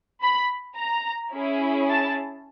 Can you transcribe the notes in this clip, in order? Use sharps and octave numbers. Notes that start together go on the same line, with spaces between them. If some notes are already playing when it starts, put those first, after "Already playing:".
B5
A#5
C#4 E4 G#4
A5